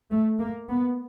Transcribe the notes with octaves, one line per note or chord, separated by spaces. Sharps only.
A3
A#3
B3